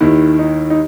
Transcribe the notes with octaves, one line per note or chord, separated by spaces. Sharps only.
D#2 D#3 E4
D#4
D#4